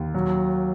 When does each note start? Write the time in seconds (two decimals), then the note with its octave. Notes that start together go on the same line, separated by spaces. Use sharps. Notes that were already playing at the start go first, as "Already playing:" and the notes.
Already playing: D#2
0.14 F#3